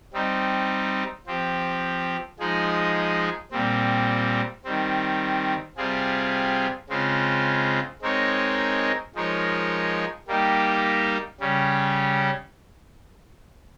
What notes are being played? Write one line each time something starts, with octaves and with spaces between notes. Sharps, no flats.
G3 C4 D#4
F3 C4 G4
F3 G#3 D#4 G#4
A#2 G3 C4
D#3 G3 C4
C3 G3 C4 F4 G#4
C#3 G#3 C4 F4
G#3 C4 D#4 A#4 C#5
F3 G#3 D#4 A#4 C#5
G3 A#3 D#4 G4
C#3 G3 C#4